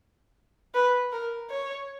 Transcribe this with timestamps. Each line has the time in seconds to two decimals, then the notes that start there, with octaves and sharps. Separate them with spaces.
0.74 B4
1.12 A#4
1.50 C#5